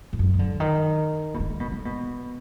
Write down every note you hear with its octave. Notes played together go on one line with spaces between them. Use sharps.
G#2
F#2
D#3
D3
D#3
B2
D3
B2
D3
B2